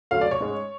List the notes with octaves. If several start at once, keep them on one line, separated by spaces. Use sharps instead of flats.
D3 F#3 A3 C#4 F5
D5
C#5
G#2 G#3 C#4